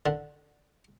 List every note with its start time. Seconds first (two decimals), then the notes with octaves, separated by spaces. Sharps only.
0.06 D3